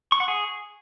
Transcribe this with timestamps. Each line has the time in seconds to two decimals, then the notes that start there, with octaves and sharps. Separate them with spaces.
0.12 C#6
0.20 F#5
0.28 G#4